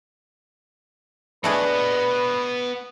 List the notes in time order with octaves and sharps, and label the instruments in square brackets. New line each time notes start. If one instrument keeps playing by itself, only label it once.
[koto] A3 D4 G#4 [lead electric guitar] B3 D#5 [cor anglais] B4